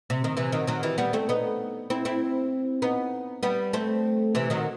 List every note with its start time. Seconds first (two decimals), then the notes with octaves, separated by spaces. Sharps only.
0.10 C3
0.24 D#3
0.37 C3 E3
0.52 D#3 F#3
0.67 D#3 F#3
0.83 E3 G3
0.98 G3 B3
1.13 A3 C4
1.29 B3 D#4
1.90 C4 E4
2.05 C4 E4
2.82 B3 D#4
3.43 G3 B3
3.73 A3 C4
4.35 C3 E3
4.50 D#3 F#3